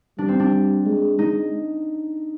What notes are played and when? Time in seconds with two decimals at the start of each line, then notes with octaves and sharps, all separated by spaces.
0.18 G3 D4
0.28 C4
0.40 D4
0.86 G#3
1.18 G#3 D#4